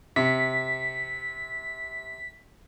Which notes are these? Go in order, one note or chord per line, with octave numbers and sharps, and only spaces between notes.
C3 B6